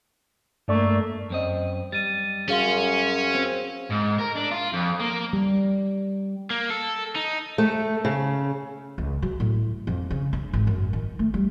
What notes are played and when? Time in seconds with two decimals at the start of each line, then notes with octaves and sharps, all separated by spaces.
0.68 G2 A3 A#3 D5 C#6
1.30 F#2 C4 D#5
1.92 G3 A6 D#7
2.48 F#2 C#4 G#4 F5 C6
3.35 C4
3.91 G#2
4.19 A#4
4.36 D4
4.52 F4
4.74 F2
5.00 A#3
5.33 G3
6.50 A#3
6.70 A4
7.16 D#4
7.58 A3
8.05 C#3
8.98 C#2
9.23 F#3
9.40 A2
9.87 F2
10.11 C#3
10.33 D4
10.53 G#1
10.67 F#2
10.93 D#3
11.19 A3
11.34 G3